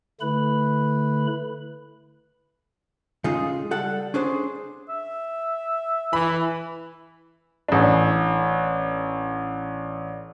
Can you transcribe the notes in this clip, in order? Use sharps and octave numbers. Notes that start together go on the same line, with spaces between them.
D3 A3 E4 B4 B5
C#3 G#3 D#4 F4 G#4
G3 A4 F#5
C#4 D4 G#4 C5
E5
E3 B5
A1 D4